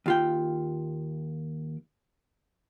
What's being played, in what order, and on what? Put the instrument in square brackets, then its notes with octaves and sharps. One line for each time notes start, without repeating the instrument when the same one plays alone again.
[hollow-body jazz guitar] D#2 F4 G5